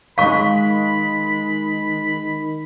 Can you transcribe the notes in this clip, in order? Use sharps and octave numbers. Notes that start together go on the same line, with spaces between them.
D#3 G#3 F5 B5 C#6 B6